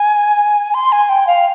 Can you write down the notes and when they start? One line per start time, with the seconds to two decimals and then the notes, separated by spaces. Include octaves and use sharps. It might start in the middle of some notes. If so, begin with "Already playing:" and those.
Already playing: G#5
0.74 C6
0.92 G#5
1.09 G5
1.27 F5